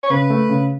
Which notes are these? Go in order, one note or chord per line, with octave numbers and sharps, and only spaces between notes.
C#5
C#3 B4
A3
C#3